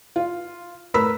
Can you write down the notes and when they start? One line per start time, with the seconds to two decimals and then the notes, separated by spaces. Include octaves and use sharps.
0.16 F4
0.94 A2 A#4 B4 B5 E6 B6